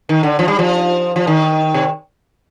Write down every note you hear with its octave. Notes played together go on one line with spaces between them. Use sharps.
D#3
D3
F3
G3
F3
F3
D#3
C3